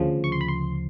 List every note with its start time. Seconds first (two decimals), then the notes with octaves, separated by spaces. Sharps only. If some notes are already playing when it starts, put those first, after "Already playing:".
Already playing: D2 C#3 F3
0.24 C#6
0.32 C6
0.41 B5
0.48 C6